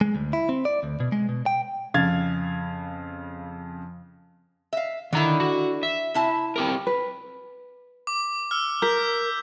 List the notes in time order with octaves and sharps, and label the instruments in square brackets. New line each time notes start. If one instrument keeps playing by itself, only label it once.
[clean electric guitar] G#3
D2
E4
C4
D5
D2
B2
G#3
B2
G5
[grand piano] F2 C#3 F5 G#6 A6
[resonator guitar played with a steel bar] E5 F5
[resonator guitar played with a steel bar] D3 E4 [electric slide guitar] D#3 A#5
[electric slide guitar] F#4
E5
[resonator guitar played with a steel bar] C3 E4 A5
[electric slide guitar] C4 G4 A#4
[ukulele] B4
[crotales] D6
E6 F6
[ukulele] A#4 [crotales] G6 B6